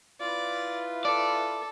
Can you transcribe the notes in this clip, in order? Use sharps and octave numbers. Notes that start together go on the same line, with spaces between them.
E4 F4 B4 D5
A4 D5